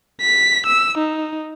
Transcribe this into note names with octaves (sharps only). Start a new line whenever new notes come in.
B6
E6
D#4